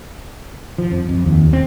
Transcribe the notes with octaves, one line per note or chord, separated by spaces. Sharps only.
F3
F2
F2
D#2
C4